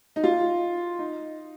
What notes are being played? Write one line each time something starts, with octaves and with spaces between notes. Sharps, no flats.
D#4
F4
D#4